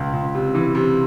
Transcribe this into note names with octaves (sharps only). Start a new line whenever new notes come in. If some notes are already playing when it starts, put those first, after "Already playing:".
Already playing: C#2
C#2
C3
E3
C3